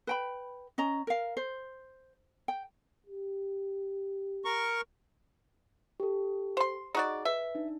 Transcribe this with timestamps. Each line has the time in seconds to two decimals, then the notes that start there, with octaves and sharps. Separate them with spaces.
0.07 B4 G5 B5
0.78 C#4 D#5 A#5
1.07 A#4 F5
1.37 C5
2.48 G5
3.06 G4
4.45 A#4 C#6
6.00 G4 A4
6.57 C5 C6
6.95 D#4 F#4 G#4 D5 D#5
7.25 B4 E5
7.55 D4 D#4